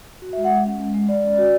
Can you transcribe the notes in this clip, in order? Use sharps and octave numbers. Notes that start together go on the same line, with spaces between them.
F#4
G#3 E5
F#5
G#3
C#4
G#3
G#3
G#3 D5
C#4
F#4